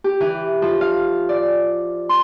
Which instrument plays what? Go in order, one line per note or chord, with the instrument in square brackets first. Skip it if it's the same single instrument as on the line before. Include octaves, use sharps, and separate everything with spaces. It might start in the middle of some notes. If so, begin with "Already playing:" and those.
[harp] G4
E3
F3
F5
D5
C6